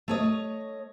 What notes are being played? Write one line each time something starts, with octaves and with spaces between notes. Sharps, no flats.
A3 C#5 D#5